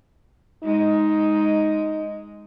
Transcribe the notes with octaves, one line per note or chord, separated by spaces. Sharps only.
G#3 D#4